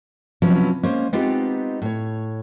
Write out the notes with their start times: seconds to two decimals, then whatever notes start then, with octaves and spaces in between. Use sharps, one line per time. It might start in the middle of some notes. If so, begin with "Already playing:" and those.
0.42 C3 F3 F#3 B3 C#4 E4
0.83 G#3 A#3 C#4 C5
1.13 G#3 B3 C4 D#4 F4 G4
1.82 A2 C#5